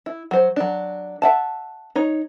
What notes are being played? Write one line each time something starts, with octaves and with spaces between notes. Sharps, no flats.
E4
F#3 C5
F#3 D4
E5 F#5 A5
D#4 C#5